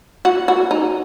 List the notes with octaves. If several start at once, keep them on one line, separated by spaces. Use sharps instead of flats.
F#4
F#4
D#4